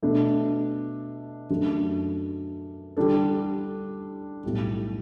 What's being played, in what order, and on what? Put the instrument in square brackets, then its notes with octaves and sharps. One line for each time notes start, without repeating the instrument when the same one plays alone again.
[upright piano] B2 A3 D4
F#2 D3 F#3 A3 D4
D3 G3 D4 A4
B1 A2 G3